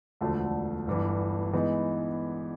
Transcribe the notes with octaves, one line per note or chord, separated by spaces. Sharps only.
E1 D2 D3 F3 A3
G1 G2 E3
E3 G#3 B3 D#4